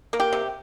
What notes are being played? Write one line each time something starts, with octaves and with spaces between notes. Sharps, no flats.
A#3
G4
C3